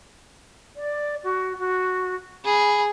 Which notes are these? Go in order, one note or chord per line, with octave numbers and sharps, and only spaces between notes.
D5
F#4
F#4
G#4 B5